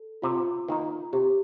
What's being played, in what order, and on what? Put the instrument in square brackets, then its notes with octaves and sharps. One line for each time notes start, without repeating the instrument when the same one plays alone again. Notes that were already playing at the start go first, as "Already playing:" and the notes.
Already playing: [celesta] A4
[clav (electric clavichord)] C3 [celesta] F4
[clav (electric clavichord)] D#3 A#3 D#4
[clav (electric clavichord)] C3 [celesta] G4